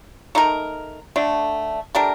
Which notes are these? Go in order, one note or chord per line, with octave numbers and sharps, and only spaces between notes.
A3 D#4 A#4
D3 A3 D4
A3 D4 G4 A#4